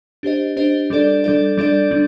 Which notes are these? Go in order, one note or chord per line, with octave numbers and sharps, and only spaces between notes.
D4 G4 C5 D#5
D4 G4 C5 D#5
G3 D4 A4 D5
G3 D4 A4 D5
G3 D4 A4 D5
G3 D4